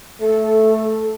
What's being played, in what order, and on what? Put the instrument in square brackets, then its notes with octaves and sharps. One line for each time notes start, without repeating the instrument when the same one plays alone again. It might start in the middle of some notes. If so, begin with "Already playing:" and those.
[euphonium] A3 [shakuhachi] A4